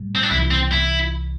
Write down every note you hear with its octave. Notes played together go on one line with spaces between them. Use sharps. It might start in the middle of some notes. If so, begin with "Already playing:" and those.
Already playing: A2 G3
C4
D4
C2 C3 E3 E4
C4
E4